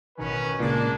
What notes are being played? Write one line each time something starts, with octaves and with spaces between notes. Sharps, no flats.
A1 B2 D#3 C#4 B4
C#2 A#2 G#3 A#3 D4 D5